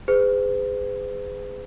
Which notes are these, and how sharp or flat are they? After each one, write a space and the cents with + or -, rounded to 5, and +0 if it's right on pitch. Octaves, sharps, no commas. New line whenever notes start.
G#4 -20 B4 +45